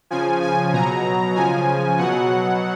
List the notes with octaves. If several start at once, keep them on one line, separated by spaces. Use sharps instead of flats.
C#3 F3 G#5
G#5
B2 F#3 A#5
C#3 F3 G#5
B2 F#3 F#5